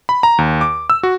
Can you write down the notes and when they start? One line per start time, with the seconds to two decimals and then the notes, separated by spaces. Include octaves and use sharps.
0.09 B5
0.23 A#5
0.38 D#2
0.61 D6
0.90 E6
1.03 F#4